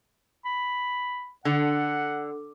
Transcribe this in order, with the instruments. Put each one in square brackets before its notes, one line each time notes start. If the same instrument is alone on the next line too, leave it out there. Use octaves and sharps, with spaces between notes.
[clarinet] B5
[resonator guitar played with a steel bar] D3 [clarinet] F#5